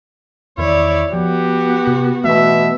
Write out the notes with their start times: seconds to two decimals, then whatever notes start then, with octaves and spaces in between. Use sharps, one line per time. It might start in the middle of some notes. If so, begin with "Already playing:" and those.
0.58 E2 D#3 E4 C#5 D5
1.13 F3 B3 F#4 G4
1.87 C3
2.24 B2 E3 A3 E5